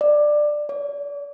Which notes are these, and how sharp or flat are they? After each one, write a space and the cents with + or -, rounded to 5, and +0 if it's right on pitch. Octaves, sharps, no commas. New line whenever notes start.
D5 +15
D5 -40